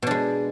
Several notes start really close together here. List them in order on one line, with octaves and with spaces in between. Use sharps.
B2 D4 G#3